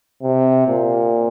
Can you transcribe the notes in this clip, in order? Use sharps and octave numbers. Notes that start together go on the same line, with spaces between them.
C3
A#2